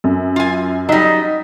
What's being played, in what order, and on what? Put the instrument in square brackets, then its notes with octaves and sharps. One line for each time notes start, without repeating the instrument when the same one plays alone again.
[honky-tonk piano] F#2
[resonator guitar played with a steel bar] F4 G#5
[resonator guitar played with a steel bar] F#3 G3 [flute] D#4 [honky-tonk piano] D#5 B6